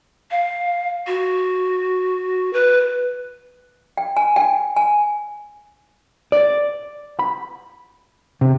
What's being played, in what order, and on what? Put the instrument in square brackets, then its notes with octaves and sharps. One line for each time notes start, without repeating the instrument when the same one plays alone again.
[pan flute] F5
F#4
B4
[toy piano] G5
G#5
G5
G#5
[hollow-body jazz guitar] D5
B5
C3